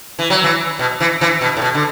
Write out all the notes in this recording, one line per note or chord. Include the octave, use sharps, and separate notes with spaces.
E3
F#3
E3
B2
E3
E3
B2
A2
B2
D3